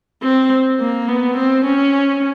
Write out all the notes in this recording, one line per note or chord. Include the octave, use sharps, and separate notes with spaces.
C4
A#3
B3
C4
C#4